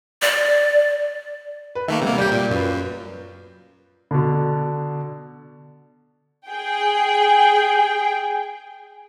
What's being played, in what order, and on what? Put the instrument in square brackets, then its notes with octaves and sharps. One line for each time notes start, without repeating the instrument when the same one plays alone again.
[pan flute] D5
[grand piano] B4
[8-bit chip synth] D#3 A3 A#3 [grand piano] E5
[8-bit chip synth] C3 A#3 [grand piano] G3 B3
[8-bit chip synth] G3 G4 [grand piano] D5 G6
[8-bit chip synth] A#2
[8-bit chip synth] F#2 [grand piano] F4 B4
[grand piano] B2 D3
[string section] G#4 G5